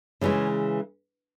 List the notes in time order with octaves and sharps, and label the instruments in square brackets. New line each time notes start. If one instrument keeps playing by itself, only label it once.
[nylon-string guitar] C#3 E3 G#3 C#4